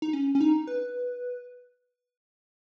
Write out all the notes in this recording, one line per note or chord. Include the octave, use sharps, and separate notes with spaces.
D#4
C#4
C#4
D#4
B4